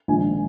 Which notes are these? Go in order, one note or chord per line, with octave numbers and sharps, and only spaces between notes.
A#1 G#2 D#3 G#5